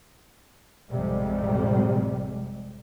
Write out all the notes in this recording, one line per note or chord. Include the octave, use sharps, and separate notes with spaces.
A1 F2 C3 G3 G#3